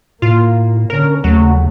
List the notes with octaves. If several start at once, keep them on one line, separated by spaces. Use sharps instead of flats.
A2 A#3 F4
D3 C#4 A#4
D#2 C#3 F#3 A3